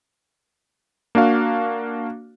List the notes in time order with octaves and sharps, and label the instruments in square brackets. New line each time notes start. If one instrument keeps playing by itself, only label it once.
[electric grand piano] A#3 D4 F#4 F5